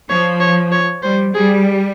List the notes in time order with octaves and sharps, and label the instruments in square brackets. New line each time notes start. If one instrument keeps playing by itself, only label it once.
[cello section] F3 [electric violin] C#5
[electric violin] C#5
C#5
[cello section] G3 [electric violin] C5
[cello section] G3 [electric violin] G#4